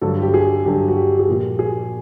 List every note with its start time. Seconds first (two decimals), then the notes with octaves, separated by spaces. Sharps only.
0.01 G2 D3 F#3 A4
0.22 G4
0.34 G#4
0.65 G2 D3 F#3 G4
0.88 F#4
0.96 G4
1.19 G#4
1.28 A#2 F3 G4
1.59 G#4